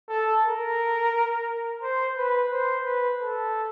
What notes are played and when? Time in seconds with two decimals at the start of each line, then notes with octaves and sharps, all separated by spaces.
0.09 A4
0.45 A#4
1.83 C5
2.17 B4
2.51 C5
2.85 B4
3.21 A4